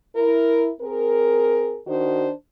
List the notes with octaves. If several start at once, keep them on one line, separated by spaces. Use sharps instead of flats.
E4 A#4
C4 G#4 A#4
D#3 D4 F#4 C5